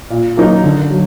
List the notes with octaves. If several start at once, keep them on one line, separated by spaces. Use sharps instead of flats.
A#2
F#3 A#3 D#4
D3
F#3